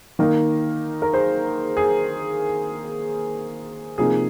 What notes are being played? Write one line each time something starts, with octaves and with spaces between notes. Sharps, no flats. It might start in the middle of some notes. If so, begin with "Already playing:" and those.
D#3 A#3 D#4
A#4
G#4 C5
G#4
C3 F3 A#3 D#4 G#4